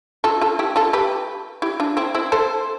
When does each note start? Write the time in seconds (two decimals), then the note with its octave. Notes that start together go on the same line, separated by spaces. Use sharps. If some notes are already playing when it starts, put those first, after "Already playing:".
0.24 F4 A4
0.41 F4 A4
0.59 E4 G4
0.76 F4 A4
0.93 G4 B4
1.62 E4 G4
1.80 D4 F4
1.97 C4 E4
2.15 C4 E4
2.32 A4 C5